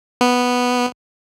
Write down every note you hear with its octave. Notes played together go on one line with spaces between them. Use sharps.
B3